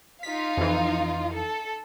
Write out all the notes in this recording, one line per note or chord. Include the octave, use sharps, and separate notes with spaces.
D#4 F4 F5 B6
F2 E3
A4